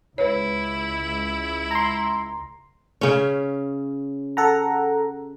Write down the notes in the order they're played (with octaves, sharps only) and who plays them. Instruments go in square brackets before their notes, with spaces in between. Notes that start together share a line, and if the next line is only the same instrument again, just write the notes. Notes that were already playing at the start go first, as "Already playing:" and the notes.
[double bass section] C#2 [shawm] E4 [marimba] B4 C#5
[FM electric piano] A#5 C6
[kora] C#3 C#4
[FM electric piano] A4 F#5 A#5